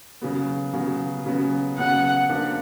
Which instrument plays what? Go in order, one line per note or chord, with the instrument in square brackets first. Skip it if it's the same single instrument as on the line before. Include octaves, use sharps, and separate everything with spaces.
[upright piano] C#3 F#3 B3
C#3 F#3 B3
C#3 F#3 B3
[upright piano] C#3 F#3 B3 [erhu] F#5
[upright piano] F3 A#3 D4